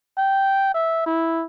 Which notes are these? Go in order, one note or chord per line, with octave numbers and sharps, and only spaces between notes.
G5
E5
E4